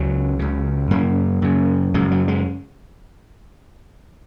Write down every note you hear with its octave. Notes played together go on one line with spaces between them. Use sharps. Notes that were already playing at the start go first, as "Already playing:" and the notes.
Already playing: C#2 C#3 F#3
C#2 C#3
F#2 C#3 A#3
F#2 C#3
F#2 C#3 G#3
F#3
G#3